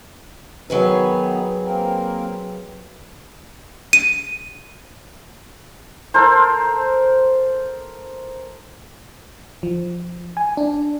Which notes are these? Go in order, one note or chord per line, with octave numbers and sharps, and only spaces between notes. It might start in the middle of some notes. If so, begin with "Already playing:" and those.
D#3 F#3 B3 D#4 G#4 B4
A#3 C4 A#4
D#7
A4 A#4 C5
F3
G#5
D4